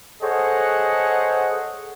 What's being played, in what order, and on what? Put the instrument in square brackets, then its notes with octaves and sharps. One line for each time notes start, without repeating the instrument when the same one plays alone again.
[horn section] G#4 A4 C5 C#5 D#5 F#5